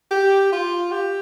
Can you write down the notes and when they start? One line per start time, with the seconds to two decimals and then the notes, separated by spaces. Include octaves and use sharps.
0.11 G4
0.52 F4
0.91 G4